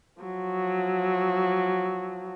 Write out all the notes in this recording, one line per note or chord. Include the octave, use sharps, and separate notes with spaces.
F3 F#3